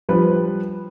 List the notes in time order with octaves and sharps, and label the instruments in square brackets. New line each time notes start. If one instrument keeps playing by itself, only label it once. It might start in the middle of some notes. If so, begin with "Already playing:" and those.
[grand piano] F3 G3 B4